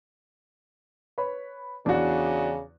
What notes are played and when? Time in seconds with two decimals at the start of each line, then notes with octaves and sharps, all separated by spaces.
1.18 B4 C#5 B5
1.86 E2 C#3 D4 F#4